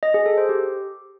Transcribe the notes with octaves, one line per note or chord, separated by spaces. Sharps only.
D#5
G#4
A4
C5
G4